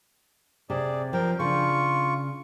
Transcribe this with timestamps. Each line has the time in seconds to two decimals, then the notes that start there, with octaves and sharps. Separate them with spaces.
0.70 C3 G#4 D5
1.13 F3 A#4 G5
1.39 C#3 D4 F4 C#6